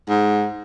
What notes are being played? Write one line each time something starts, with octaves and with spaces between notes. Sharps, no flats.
G#2